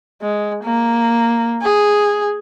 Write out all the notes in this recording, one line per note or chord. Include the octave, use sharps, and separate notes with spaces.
G#3
A#3
G#4